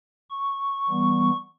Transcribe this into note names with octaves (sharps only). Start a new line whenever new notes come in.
C#6
E3 G3 B3